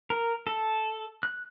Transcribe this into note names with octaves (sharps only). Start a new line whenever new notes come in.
A#4
A4
F#6